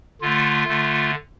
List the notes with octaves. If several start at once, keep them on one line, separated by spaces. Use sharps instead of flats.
D3 A3 F4
D3 A3